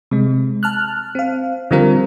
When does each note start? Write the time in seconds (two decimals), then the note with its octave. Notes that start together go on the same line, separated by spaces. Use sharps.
0.11 C3 G#3
0.63 A5 F6 F#6
1.15 C4 F5
1.71 D3 F3 G3 C4 F4 A#4